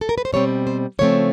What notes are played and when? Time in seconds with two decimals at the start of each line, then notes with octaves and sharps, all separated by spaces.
0.01 A4
0.09 A#4
0.18 B4
0.25 C5
0.32 B2 G3 C4 C#5
0.67 C5
0.99 C#3 F3 A3 C4 C#5